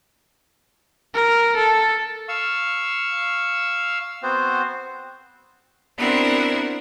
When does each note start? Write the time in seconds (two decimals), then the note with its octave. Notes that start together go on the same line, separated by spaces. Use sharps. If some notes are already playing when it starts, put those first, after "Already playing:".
1.14 A#4
1.56 A4
2.29 F5 C#6 E6
4.23 B3 C4 F#4 C5
5.97 B3 C4 D4 E4 F#4 A#4